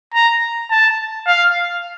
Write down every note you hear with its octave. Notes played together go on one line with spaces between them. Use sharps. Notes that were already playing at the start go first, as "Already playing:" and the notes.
A#5
A5
F5